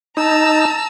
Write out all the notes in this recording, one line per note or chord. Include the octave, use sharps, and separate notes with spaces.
D#4 A5 A#5 E6